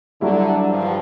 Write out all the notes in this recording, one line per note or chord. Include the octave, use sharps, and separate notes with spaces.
D3 F#3 G3 E4
G2 F3